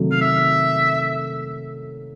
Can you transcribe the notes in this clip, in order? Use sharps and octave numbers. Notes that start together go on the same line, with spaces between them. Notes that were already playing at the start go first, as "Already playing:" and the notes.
Already playing: C3 D#3 F#3 A3
F5
E5